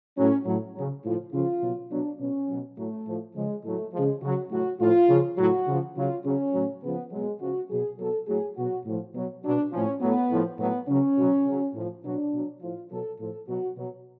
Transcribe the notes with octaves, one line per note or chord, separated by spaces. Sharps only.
A2 F#3 C#4
A2 F#3
C#3 F#3
A2 F3
C#3 F3 F4
B2 F#3
B2 F#3 D4
B2 F#3 C#4
B2 F#3
A2 F#3 A3
A2 F3
C#3 F3 G#3
A2 F#3 A3
C#3 F3 G#3
C#3 F#3 F#4
A2 F#3 F#4
A2 F3 F4
C#3 F3
A2 F#3 F#4
C#3 F3
C#3 F#3 F4
C#3 F#3 C#4
A2 F#3
C#3 F3 B3
B2 F#3 G#3
C#3 F3 F#4
B2 F#3 G#4
B2 F#3 A4
A2 F#3 G#4
B2 F#3 F#4
A2 F3
B2 F#3
B2 F#3 D4
A2 F3 C#4
A2 F#3 B3
A2 F3
A2 F#3 B3
C#3 F#3 C#4
B2 F#3
C#3 F#3
A2 F3
B2 F#3 D4
B2 F#3
A2 F3 F4
B2 F#3 A4
A2 F3 A4
B2 F#3 F#4
B2 F#3